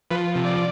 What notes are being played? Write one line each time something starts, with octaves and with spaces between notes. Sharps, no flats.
F3 B4
C3
D5